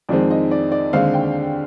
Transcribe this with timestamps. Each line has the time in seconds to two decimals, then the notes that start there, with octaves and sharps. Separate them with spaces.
0.09 F2 D#3 G#3 C4 D5
0.31 D#5
0.51 D5
0.72 D5
0.93 D#2 D3 G#3 C4 F5
1.14 G5